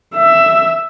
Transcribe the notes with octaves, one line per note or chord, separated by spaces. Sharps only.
E5